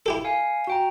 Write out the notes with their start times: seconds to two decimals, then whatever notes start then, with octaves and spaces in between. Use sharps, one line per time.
0.06 E4 G4 A4
0.25 F5 G#5 C#7
0.67 F#4 G5 A#5